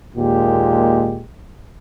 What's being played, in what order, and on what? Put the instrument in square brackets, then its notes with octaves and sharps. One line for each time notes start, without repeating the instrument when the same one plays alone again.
[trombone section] D#2 A#2 G#3 G4